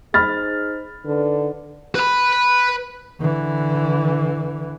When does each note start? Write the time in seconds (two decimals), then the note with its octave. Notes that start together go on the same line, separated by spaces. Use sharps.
0.14 D#4 G#4 C5 B5 F6 A6
1.06 D3 D4 D#4 B4
1.95 B4 B5
3.20 D3 E3